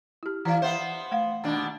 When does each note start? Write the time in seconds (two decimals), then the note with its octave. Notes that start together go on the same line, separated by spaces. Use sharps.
0.23 E4 G4
0.45 E3 E4 D5 F5
0.62 B3 C5 E5
1.11 A3 F5 F#5
1.44 D#2 B2 D4